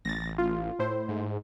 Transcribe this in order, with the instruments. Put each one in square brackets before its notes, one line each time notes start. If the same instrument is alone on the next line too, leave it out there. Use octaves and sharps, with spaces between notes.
[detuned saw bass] A1 [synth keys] A6 A#6
[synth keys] F4
A2 E4 C5
[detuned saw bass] G#2